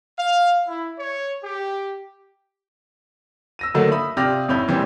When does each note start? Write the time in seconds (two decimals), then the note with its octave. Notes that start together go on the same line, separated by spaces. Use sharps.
0.17 F5
0.67 E4
0.98 C#5
1.41 G4
3.59 E6 A#6 D#7
3.74 D3 D#3 F#3 A3 A#3 D#4
3.91 E5 B5 D#6
4.17 C3 F4 G4 D5 F6 A#6
4.48 G#1 F2 C#4 E4 B5 G6
4.68 A#2 E3 G3 C4